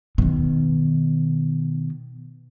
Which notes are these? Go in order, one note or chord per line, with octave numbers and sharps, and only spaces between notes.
B2 D#3